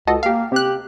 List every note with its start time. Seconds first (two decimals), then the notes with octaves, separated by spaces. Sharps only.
0.07 C#2 F#4 A4 D#5
0.23 A#3 G4 F5
0.52 C3 G4 F#6